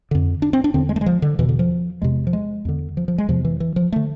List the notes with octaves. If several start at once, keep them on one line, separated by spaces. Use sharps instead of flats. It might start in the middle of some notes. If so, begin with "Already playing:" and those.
F2 D3
D4
C4
D4
E2 D3 C4
G#3
A3
G#3
F3
D3
E2 B2 E3
D3
F3
E2 C3 G#3
F3
G#3
E2 D3
F3
F3
G#3
E2 C3 F3
E3
E3
F3
D3 A3